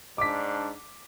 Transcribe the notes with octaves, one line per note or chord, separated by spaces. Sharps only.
G#2 D4 D6 B6